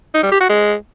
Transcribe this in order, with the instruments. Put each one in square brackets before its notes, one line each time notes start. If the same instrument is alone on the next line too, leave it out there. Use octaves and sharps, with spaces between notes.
[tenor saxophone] D#4
G3
G4
F#4
G#3